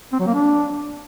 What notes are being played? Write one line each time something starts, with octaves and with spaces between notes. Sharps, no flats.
C4
F#3
A#3
D4